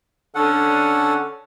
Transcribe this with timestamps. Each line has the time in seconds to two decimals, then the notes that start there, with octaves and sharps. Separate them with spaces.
0.35 D3 C#4 A4 F#5